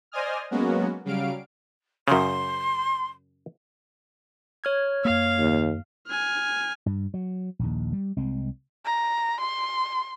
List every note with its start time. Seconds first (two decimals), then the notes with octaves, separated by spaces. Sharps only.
0.12 C5 D5 D#5 G#5 D#6 F6
0.51 F#3 G#3 A#3 B3 C#4 F#4
1.05 C#3 F#3 G3 F5 D7
2.08 F#2 C#3 C6
4.64 C#5 F6 G#6
5.05 F#2 A#3 F5
5.38 D#2
6.08 G#5 F6
6.86 G2
7.14 F#3
7.59 A#1 D#2
7.93 G3
8.17 C2 G#3 C4
8.85 A#5
9.41 C6